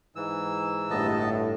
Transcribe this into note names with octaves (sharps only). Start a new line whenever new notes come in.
G#2 E3 E6
G1 A2 B3 D#5 A5